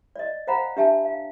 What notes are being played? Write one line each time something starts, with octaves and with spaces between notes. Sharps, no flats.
D5 D#5
C5 F5 F#5 G#5 A#5 B5
D4 G4 E5 G#5 A5
F5